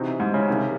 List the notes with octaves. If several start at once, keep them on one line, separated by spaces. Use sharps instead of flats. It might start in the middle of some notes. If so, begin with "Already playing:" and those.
Already playing: C3 E3 C4 D#4 F#4
G#2
C#3
C2 C3 D#3